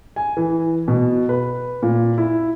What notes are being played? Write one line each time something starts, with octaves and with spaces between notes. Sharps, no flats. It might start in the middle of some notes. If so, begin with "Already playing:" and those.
G#5
E3
B2
B4
A#2
E4